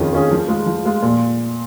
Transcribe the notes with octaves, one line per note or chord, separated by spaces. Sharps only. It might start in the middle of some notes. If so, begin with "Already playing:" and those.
Already playing: F2 D#3 C#4 F4 G#4
D#3 C#4 F4 G#4
F3
G#3 F4
F3
G#3 F4
A#2